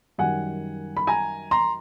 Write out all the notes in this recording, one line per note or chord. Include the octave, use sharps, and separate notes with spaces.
F#2 D#3 G3 F#5 G#5
B5
G#5 A#5
A#5 C6